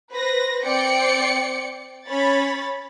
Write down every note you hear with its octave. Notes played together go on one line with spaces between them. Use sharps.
B4 C5 A#6
C4 D5 G5 C#7
C#4 C#5 B5 A6